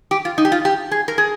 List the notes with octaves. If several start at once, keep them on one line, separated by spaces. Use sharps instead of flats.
G4
F4
D#4
G4
F4
G4
G#4
A#4
G#4